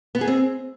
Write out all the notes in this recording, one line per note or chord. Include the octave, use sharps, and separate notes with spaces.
B3
G#4
C4